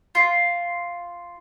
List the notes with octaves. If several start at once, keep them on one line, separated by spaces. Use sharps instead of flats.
F4